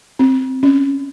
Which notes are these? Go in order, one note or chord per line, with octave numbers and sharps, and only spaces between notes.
C4
C#4